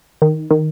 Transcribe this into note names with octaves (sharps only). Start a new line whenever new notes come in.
D#3
D#3